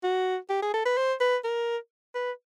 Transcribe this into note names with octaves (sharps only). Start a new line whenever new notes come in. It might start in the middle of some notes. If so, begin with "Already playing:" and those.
F#4
G4
G#4
A4
B4
C5
B4
A#4
B4